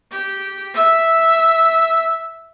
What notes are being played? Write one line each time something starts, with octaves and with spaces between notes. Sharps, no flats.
G4
E5